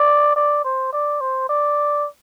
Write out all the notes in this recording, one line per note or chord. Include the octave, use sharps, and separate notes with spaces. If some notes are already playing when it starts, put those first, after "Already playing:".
Already playing: D5
D5
C5
D5
C5
D5